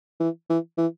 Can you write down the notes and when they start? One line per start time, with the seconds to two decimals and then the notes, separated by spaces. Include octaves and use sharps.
0.20 E3
0.50 E3
0.78 E3